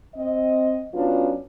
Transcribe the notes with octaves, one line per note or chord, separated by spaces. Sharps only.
C4 D#5
F#3 B3 C#4 D4 F4